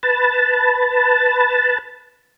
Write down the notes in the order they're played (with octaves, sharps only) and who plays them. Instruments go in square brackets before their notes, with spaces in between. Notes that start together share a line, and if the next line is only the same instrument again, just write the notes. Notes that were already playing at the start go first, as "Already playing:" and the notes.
[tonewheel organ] B4 A5